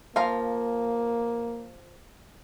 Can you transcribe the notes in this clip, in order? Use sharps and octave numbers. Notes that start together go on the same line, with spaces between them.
F3 A#3 F5 A#5